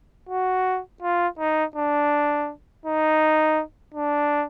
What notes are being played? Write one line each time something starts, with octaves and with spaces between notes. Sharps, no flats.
F#4
F4
D#4
D4
D#4
D4